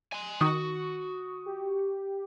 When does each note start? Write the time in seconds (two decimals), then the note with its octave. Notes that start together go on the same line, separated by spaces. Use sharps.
0.12 G#5 C6
0.41 D#3 F#4 C#6 D#6
1.46 G4